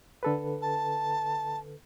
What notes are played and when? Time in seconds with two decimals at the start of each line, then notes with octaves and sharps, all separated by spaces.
0.23 D3 A4 B4
0.62 A5